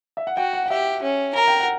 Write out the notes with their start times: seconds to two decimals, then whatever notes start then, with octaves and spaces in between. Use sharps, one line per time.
0.17 E5
0.27 F#5
0.37 F#4 G5
0.53 F#5
0.66 F#5
0.70 G4 E5
1.03 C#4
1.35 A#4 A#5
1.48 G5
1.60 F#5